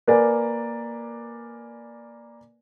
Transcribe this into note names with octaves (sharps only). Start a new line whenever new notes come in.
A#3 A#4 B4 D5 G#5